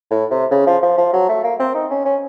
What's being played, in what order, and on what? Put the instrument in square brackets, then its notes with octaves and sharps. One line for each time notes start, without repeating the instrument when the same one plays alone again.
[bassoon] A2
C3
C#3
F3
F3
F3
F#3
A3
A#3
C4
D#4
C#4
C#4